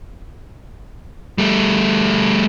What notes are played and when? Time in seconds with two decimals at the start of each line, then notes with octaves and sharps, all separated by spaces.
1.38 G3 A3